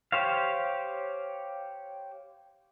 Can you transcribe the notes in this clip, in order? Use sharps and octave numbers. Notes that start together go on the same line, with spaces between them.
G4 C5 C#5 F5